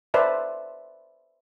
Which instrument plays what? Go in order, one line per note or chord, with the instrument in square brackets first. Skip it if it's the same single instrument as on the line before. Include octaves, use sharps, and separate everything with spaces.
[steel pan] B4 C5 D5 E5 A5